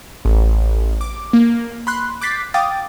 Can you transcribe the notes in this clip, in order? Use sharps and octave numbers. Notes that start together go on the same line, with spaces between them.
A1
D6
A#3
B5 C6 F#6
D6 F#6 G6 A6 B6 C7
F5 G5 D6 D#6 A6